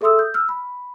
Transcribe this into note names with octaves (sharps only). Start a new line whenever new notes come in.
G#4 A4 E5 C6 D#6 E6
G6
E6 F6
B5